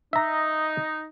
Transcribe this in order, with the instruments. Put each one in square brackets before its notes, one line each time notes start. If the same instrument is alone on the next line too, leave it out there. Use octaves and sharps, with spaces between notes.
[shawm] D#4 [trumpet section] D#5 [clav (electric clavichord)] E5 A#5